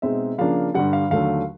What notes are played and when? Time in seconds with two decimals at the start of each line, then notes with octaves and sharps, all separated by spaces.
0.02 B2 G#3 C4 D#4 E5
0.38 C#3 F3 A#3 D4 F5
0.74 G2 D3 G3 F#5
0.93 F5
1.10 D#2 D3 F#3 A3 F5